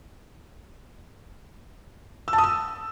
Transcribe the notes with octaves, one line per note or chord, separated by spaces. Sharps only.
E6
A5
D#6
E6